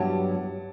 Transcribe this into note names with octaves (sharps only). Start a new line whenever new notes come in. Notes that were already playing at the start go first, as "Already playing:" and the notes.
Already playing: G2 F#3 B3 E4 G4 F#5 A5